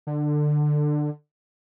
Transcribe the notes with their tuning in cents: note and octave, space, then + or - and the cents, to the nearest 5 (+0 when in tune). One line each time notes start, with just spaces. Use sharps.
D3 +20